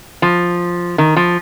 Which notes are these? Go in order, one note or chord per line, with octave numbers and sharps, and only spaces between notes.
F3
D#3
F3